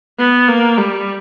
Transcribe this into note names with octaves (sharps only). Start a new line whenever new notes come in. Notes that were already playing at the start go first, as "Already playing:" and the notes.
B3
A#3
G3